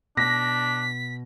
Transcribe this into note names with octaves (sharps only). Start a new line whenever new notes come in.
B2 D4 A#6 B6